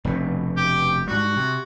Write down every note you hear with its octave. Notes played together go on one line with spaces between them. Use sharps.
F1 G2 B2
G4
G#2 G3 F#4
C3